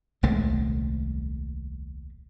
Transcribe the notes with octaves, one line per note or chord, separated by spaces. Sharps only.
D#1 C2 G#3 A3